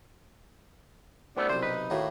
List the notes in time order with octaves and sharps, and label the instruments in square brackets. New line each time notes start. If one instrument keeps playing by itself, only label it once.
[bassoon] C2 [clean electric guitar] A3 B3 [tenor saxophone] D4
[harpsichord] B1 C3 [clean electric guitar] C5
[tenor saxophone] D#4 [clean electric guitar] B4
[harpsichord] D#2 A#3 F#4 [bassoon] A2